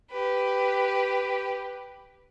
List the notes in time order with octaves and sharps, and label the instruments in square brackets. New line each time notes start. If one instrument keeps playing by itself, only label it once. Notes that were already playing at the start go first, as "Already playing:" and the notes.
[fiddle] G4 B4